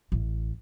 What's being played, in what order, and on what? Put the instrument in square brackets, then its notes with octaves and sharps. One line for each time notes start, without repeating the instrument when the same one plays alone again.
[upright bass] A1